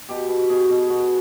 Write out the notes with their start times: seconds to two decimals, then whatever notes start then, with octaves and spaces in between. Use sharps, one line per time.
0.09 B2 G4
0.29 B2
0.49 B2 G#4
0.70 B2
0.90 B2 F#4